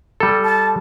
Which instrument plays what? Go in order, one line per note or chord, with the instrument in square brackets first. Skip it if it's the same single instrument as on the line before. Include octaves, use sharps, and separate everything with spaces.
[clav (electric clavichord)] G3 A4
[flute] A5